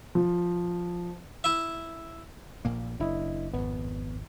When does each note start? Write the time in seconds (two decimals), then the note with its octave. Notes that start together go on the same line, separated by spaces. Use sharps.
0.15 F3
1.44 E4 E5
2.65 A#1 A#2 A#3
3.00 F#1 D4 E4 D#5
3.54 G#1 F2 B3